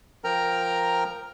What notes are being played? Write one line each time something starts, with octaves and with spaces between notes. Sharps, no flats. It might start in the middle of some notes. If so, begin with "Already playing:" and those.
F3 A#4 G5 A#5 F6